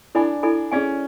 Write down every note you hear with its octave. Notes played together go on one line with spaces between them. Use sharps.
D4 E4 A4 D5 G#5 B5
E4 A4 D5 G#5 B5
C#4 G#4 D5 G#5